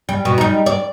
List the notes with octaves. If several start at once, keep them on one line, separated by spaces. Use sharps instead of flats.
G3
B2
G3 D#4
D5